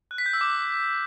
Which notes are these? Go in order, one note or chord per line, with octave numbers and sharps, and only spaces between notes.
F#6
B6
G6
E6
D6